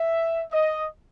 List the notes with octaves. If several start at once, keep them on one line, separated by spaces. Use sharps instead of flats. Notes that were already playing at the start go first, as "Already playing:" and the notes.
Already playing: E5
D#5